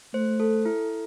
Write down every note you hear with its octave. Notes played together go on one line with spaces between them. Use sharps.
A3 C5
A4
E4
A4